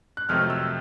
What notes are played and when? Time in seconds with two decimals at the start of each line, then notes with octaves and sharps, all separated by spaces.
0.17 F#6
0.29 F2 C3 D#3 F#3 A3 F6
0.50 E6